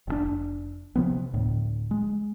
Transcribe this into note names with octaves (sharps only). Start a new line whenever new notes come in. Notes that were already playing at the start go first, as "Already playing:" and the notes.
F1 A#2 D4
C3 F3 B3
D2 A2
G#3